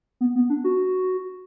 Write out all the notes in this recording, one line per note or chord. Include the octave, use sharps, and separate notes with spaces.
B3
B3
D4
F#4